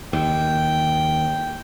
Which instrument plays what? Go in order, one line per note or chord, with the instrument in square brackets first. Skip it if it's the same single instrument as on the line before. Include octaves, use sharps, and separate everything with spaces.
[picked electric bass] D#2 [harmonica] G5